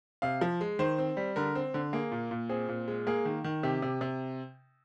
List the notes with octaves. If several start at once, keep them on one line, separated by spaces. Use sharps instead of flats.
C3 F5
F3
G#3
D#3 C5
C4
G3
D3 A#4
C4
D3
A#3 G#4
A#2
A#2
C4 G#4
A#2
G#3
A#3 G#4
D#3
D#3
C3 G4
C3
C3